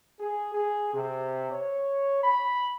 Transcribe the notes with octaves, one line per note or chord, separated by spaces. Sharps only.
G#4
G#4
C3
C#5
B5